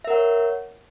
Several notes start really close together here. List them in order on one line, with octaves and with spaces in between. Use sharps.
E5 A#4 F#5 C#5